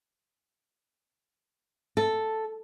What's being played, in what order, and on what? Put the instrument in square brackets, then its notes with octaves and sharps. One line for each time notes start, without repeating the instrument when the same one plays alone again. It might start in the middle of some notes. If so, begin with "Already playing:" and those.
[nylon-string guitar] A4